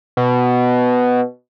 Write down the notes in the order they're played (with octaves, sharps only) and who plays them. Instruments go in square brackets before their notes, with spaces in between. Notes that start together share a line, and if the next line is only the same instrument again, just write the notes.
[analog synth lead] B2